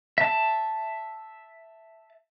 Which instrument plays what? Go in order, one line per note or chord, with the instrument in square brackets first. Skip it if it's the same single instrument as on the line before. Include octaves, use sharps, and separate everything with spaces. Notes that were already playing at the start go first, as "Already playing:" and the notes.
[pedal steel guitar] E5 A5